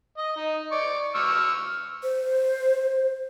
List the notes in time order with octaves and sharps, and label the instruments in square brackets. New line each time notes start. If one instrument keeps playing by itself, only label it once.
[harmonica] D#5
D#4
D5 C#6
C#6 E6 F6
[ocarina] C5